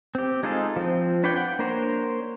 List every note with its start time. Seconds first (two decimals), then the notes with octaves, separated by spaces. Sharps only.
0.15 C4 G4
0.43 G#3 D#4 F4 G#4 A4
0.76 F3 C4
1.23 D4 B4 C#5 D5 G5
1.36 F#5 G5
1.59 A#3 D4 A#4 C5 C#5